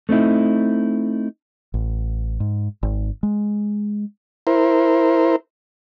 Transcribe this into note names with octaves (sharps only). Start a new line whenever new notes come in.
A3 C4 D#4 E4
A1
G#2
G#1
G#3
E4 A#4 C5